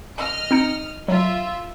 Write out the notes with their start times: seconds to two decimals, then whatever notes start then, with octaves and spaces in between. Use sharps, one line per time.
0.18 D#5 F6
0.51 C4 D#4 C#7
1.08 F#3 F4 E5